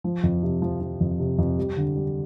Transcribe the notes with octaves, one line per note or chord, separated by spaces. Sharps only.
F3
F2
C3
F3
F3
F2
C3
F2
G3
D3
G3